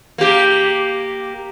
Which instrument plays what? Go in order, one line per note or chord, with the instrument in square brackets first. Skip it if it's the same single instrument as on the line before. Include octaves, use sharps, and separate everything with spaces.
[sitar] A#3 G4